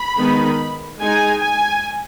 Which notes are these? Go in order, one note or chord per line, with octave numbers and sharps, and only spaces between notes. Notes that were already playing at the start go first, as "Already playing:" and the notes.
Already playing: B5
D#3 G#3 B3 D#4
G#3 D#4 G#5
G#5